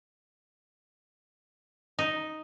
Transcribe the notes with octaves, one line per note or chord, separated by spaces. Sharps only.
D#4